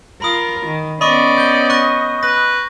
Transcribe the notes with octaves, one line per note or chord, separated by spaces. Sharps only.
F4 A#4 B5 D#6
D#3
B3 C#4 D5 D#5 B5 C#6
G6 G7
C#6 F#6 A#6
B4 A#6